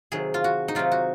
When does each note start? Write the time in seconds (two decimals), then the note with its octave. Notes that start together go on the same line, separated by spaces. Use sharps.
0.12 C3 D#3 F#3 G#4
0.34 F4
0.44 F#4
0.68 D#4
0.75 C3 D#3 F#3 F4
0.92 F#4